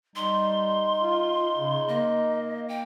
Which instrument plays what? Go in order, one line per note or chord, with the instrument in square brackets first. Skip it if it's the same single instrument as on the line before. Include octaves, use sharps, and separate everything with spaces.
[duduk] G3 [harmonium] D#4 [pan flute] C6
[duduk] F4
C#3
[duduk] A#3 [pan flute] D#5
[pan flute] G5